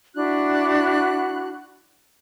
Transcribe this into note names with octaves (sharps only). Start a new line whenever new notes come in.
D4 E4 F#4 F#6